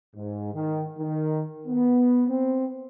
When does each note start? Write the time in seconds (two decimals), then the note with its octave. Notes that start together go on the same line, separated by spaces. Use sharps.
0.16 G#2
0.54 D#3
0.98 D#3
1.67 B3
2.28 C4